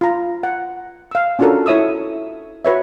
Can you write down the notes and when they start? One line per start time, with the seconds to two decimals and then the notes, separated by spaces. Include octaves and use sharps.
0.01 F4 A#5
0.43 F#5
1.11 F5 E6
1.39 C#4 D4 F4 F#4 A4 A#4
1.66 E4 C#5 E5 D#6 E6
2.65 F#4 B4 C#5 E5